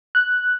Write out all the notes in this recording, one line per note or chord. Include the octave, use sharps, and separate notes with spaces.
F#6